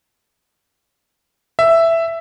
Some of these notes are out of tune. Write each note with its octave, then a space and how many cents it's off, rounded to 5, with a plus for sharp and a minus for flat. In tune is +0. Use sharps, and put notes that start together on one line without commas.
E5 +5